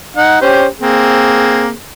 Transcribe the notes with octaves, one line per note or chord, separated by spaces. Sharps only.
D#4 F#5
C#4 G4 C5
A#3 C4 G#4